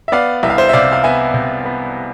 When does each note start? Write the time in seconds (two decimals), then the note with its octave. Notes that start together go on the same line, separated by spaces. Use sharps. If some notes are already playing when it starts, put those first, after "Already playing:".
0.08 E5
0.12 B3 D5 F5
0.43 C2 E5
0.50 F5
0.58 C5 E5
0.69 E5
0.73 C3 D5 F5
0.92 F5
1.04 B3 E5 G#5
1.34 C3
1.65 B3